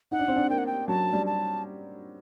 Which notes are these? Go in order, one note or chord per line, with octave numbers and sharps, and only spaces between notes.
D#4 F#5
D4
C4
D4
A#3 G5
F#5
G5
F#3 A5
G3
A5